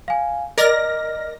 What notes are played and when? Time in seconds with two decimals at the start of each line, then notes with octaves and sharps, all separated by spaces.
0.08 F5 G#5
0.58 A#4 D5 D#5 F6 A#6